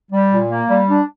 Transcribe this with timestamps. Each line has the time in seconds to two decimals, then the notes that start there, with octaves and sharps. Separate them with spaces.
0.12 G3
0.31 A#2
0.49 A#3
0.69 G3
0.88 D4